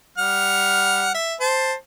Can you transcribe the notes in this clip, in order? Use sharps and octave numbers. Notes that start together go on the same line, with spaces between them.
G3 F#5 F6
E5
C5 A5